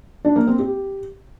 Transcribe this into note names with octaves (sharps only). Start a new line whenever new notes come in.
D4
A#3
C4
G4